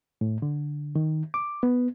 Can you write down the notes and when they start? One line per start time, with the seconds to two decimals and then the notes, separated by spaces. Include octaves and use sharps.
0.21 A2
0.42 D3
0.96 D#3
1.34 D6
1.63 B3